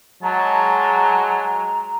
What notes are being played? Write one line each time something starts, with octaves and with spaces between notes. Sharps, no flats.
F#3 G#3 A5 A#5